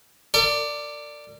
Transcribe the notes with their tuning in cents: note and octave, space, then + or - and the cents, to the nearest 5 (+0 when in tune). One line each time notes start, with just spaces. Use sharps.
A#4 -40 D5 +5